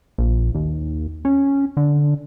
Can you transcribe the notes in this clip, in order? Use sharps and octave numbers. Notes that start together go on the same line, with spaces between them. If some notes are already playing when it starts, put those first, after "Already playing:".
A#1
D#2
C#4
D3